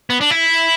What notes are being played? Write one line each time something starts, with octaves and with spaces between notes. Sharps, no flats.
B3
D4
E4